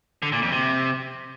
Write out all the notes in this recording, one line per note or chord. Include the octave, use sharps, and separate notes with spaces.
D3
A#2
F2
C3